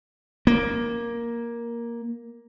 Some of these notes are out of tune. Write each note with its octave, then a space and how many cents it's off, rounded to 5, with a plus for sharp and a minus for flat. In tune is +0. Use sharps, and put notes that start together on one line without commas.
A#3 +10